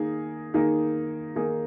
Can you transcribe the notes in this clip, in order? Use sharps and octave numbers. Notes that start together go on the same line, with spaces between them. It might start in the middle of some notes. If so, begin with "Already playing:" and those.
Already playing: D#3 A#3 D#4 G#4
D#3 A#3 D#4 G#4
D#3 A#3 D#4 G#4